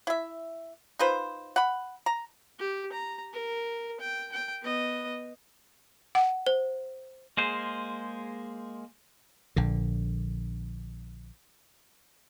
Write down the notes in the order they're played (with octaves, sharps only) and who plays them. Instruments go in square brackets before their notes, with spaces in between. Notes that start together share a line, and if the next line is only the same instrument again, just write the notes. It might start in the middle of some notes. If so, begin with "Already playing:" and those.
[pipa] E4 E5
D#4 F4 B4 C5
F#5 B5
A#5
[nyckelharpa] G4
A#5
A#4
G5
G5
B3 D#5
[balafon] F#5
[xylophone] C5
[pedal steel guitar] G#3 A#3 G#4 C5
[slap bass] A#1 D3